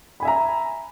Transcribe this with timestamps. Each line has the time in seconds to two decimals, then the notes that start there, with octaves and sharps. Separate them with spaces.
0.20 B5
0.23 G#5
0.25 E5
0.28 A#5